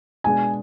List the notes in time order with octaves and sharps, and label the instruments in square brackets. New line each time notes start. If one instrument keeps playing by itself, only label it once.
[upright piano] B2 G#3 D4 [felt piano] G#5